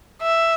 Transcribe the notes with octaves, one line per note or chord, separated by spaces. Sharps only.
E5